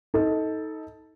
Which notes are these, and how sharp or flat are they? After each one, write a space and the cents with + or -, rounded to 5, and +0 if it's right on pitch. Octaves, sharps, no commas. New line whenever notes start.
D#4 +25 A4 +0